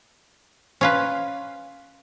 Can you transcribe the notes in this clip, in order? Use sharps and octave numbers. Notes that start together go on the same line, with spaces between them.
C#4 F4 B4